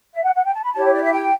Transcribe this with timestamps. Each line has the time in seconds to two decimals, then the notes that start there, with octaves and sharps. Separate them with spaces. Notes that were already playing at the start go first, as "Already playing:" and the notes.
0.13 E5
0.23 F#5
0.33 F#5
0.44 G5
0.53 A5
0.63 B5
0.73 E4 G4 C#5 A5
0.83 C#5
0.93 D5
1.03 E5
1.12 G5